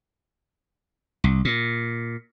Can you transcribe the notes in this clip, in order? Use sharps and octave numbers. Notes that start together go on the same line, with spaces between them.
C2
A#2